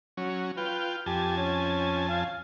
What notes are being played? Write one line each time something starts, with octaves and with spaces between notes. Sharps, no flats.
F#3 C#4
F4 B4 G5
F2 G4 G#5 A5
C#4
F5